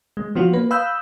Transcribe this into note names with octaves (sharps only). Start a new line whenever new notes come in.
G#3
F3 B3 F4 F#4
A#3 B4
F5 B5 D#6 E6 F#6 G6